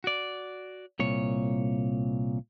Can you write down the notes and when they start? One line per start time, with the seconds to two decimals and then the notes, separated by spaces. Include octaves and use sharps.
0.04 F#4 D5
0.99 C2 A#2 C#5